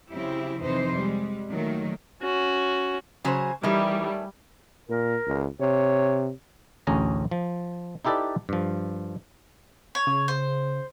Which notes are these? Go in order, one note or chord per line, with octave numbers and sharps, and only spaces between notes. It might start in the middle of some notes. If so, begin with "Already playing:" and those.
C#3 F#3 C4 E4 G4
F2 C3 E3 D#4 B4 C5
G3 G#3
A#2 D#3 F#3 A3
C#4 F#4
C#3 F#3 C5 G#5
D#3 E3 G3 A3 C#4 D#4
A#2 A#4
C#2
C3 C#5
A1 D2 C#4 G#4 A#5
F3
D#4 E4 G4 A4 B4 D5
G2 F3
C#5
C#3
C5